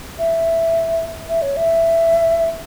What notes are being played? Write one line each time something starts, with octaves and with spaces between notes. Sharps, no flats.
E5
E5
C#5
E5